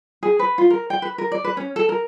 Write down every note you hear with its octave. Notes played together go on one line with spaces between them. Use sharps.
G#4
B4
F4
A#4
G5
B4
A#4
D5
B4
C#4
A4
A#4